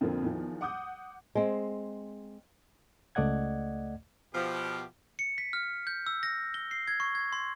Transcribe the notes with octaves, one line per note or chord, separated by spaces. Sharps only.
F2 D3 F3 A#3 C4
E2 D#3 F3
F#5 D6 D#6 G6
G#3 C4
C#2 A3 D5 D#5 F#5 G#6
B2 F3 G4
C#7
B6
F6
G6
E6
A#6
G7
C7
G#6
C#6
G#6
C6